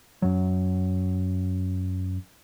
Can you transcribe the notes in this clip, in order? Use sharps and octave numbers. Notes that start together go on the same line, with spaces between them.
F#2 F#3